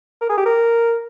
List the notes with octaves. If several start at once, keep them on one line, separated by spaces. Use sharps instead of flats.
A#4
G#4
G4
A#4